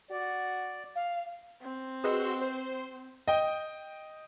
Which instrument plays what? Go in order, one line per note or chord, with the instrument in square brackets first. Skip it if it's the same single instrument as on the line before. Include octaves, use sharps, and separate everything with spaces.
[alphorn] F#4 [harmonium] D5
[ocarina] F5
[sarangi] C4
[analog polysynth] F#4 C6 E6 [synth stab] G#4 B4 D#5
[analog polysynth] C5
[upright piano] D#5 G5